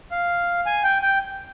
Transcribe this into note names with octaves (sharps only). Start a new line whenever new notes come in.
F5
G#5
G5
G5